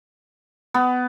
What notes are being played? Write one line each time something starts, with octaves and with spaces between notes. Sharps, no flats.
B3